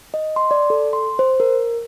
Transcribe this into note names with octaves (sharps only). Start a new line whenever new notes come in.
D#5
C6
D5
A4
C6
C5
A#4